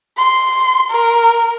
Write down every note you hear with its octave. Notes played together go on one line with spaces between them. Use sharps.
C6
A#4